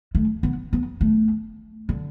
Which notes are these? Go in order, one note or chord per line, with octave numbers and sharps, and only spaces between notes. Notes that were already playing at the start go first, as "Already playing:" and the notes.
A3
B3
B3
A3
D3